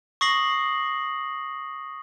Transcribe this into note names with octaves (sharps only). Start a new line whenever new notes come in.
C#6 D#6 A#6 C7 F#7